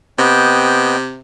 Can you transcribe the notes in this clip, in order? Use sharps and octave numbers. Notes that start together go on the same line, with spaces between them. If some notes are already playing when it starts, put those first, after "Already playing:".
C3 B3 D#5 G5